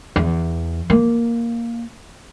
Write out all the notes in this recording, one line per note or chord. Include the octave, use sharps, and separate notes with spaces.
E2
A#3